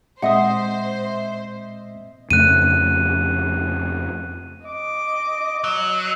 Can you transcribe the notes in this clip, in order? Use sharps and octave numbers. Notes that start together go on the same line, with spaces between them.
A#2 G#3 C4 C5 D#5 E5 F#5 D#6
F2 C#3 A3 F#6 D#7
D#5 D6
F#3